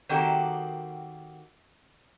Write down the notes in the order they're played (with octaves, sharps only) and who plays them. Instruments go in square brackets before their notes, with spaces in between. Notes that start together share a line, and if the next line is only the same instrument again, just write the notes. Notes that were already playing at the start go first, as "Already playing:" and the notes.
[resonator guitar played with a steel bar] D#3 A#3 C4 F#4 G4 A4